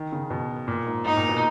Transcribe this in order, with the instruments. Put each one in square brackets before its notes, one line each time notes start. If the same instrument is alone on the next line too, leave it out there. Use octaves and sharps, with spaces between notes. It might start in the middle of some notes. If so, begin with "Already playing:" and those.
Already playing: [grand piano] D#3
C#3
B2
A#2
G#2
[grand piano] G#2 [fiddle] D#4
[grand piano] A#2
B2